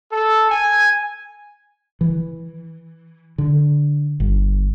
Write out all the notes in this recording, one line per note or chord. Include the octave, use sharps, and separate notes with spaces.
A4
G#5
E3
D3
G1